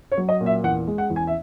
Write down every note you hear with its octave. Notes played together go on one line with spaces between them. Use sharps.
C#5
F#3
D#5
A#2
E5
E2 F#5
G#3
F#5
E2
G#5
E5